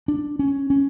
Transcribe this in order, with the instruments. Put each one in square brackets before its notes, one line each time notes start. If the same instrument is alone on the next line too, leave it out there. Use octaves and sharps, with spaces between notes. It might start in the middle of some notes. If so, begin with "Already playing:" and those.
[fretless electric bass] D4
C#4
C#4